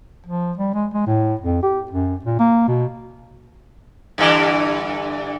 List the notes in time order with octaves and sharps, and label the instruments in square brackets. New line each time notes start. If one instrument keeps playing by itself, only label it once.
[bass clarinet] F3
G3
G#3
G#3
A2
F2
G4
F#2
A#2
A#3
B2
[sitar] G2 D3 E3